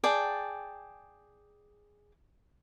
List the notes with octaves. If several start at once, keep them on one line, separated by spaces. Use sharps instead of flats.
G#4 D5 G5 A5